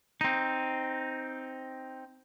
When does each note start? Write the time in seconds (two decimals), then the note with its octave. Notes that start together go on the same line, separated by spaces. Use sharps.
0.21 C4 D#4